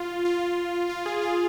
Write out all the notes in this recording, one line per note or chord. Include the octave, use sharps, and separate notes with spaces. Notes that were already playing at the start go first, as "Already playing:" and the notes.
Already playing: F4
F4
F4
G#4
F4